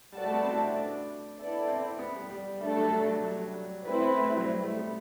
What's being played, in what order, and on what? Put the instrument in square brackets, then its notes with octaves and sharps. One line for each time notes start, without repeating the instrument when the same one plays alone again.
[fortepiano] G3 [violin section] F#4 A4 D5 A5
[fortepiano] A3
B3
C4
E4
D4
D4
D4
[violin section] B3 E4 A4 D5
[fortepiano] C4
B3
G3
G3
[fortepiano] G3 [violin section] A3 D4 A4
[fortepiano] F#3
F#3
G3
F#3
G3
F#3
G3
[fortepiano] A3 [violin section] C4 E4 B4
[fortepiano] B3
A3
G3
F#3
G3
A3
B3